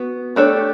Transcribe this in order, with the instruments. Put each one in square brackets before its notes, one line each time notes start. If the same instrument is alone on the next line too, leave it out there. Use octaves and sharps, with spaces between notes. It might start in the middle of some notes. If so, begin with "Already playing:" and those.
Already playing: [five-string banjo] B3 F#4
[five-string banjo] A3 D4 A4 C#5 [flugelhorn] G4